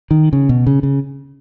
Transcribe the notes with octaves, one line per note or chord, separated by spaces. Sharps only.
D#3
C#3
B2
C#3
C#3